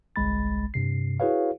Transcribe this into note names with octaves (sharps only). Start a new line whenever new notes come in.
G1 C2 G#3 B5 A6
G2 C3 C7
E4 F#4 G#4 B4 C#5 F5